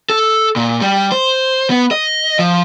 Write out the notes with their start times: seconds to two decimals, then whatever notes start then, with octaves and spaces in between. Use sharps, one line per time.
0.10 A4
0.56 A#2
0.81 G3
1.12 C5
1.70 B3
1.91 D#5
2.39 F3